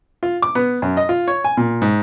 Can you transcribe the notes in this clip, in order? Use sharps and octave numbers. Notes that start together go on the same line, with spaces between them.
F4
D6
B3
F#2
D#5
F4
C#5
G#5
A#2
G#2